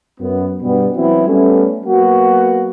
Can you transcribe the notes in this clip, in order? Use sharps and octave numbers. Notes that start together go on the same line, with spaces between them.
F#2 B3
G2 B2 G3 B3
E3 F#3 B3 C4 E4
G3 A3 B3 C#4
F#3 A#3 B3 F#4